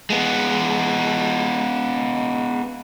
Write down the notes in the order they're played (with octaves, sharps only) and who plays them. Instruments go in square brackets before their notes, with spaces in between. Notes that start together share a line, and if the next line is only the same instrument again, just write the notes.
[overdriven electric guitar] G#3 B3